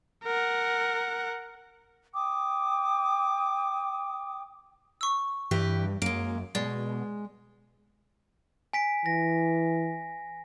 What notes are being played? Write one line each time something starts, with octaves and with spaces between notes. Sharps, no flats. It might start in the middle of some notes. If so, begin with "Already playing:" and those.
A#4 F#5
G5 D6 D#6
C#6 E6
G2 E3 G4 B4
F#2 G#3 A#3 D7
B2 G#3 D5
G#5 B6 D7
E3 A#6